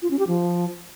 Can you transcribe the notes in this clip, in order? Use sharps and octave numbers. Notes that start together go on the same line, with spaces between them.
F4
C#4
G4
F3